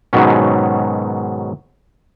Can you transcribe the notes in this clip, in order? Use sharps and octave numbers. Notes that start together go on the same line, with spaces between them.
G#2 B2 D#3 F#3 C#4